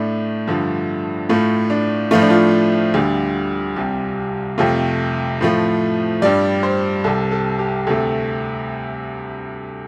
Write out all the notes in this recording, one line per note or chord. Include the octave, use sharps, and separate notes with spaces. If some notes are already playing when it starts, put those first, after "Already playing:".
Already playing: A2 A3 D4
G2 D3 F3 A3
A2 A3 F4
D4
A2 F3 A3 F4
D4
F4
D2 D3 G3
C2 C3 G3
F2 C3 A3 F4
A2 F3 A3
G2 G3 D5
C5
C2 C3 G3 A4
A4
G4
D2 C3 A3 A4